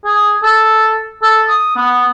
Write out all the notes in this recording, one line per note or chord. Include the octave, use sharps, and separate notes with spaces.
G#4
A4
A4
D#6
B3